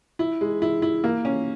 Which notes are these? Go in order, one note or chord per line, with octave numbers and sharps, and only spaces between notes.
E4
G#3
E4
E4
A#3
C#4